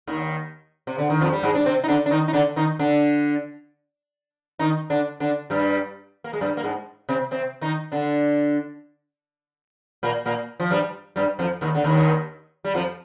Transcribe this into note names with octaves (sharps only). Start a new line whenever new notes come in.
D#2 D#3
C3
D3
D#3
F2 F3
G3
G#2 G#3
D4
C3 C4
D#4
D3 D4
D4
D#3 D#4
D#4
D3 D4
D#3 D#4
D3 D4
D#3 D#4
D3 D4
D3 D4
G2 G3
A#3
G#3
G2 G3
A#3
G#2 G#3
C3 C4
C3 C4
D#3 D#4
D3 D4
A#2 A#3
A#2 A#3
F3
G2 G3
G2 G3
F2 F3
D#2 D#3
D3
D#2 D#3
G3
F2 F3